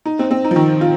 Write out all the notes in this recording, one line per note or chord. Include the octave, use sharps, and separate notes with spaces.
D#4
C4
C4
D#4
F3
D#3
F4